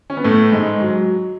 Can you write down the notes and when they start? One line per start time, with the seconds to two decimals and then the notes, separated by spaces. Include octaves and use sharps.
0.10 C#4
0.17 B3
0.24 A2 A3
0.52 G#2 G#3
0.81 F#3